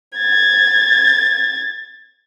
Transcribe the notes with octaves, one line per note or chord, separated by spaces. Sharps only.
G#6 A6